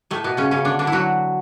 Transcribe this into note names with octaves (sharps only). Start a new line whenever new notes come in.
A2 A3
B2 B3
C#3 C#4
C#3 C#4
D3 D4
D3 D4
E4
F#3 F#4